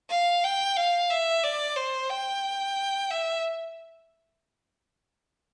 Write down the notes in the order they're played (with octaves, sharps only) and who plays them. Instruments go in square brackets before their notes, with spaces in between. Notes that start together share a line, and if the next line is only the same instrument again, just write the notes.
[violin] F5
G5
F5
E5
D5
C5
G5
E5